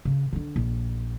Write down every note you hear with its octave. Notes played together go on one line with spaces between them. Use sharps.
C#3
D3 D4
A#1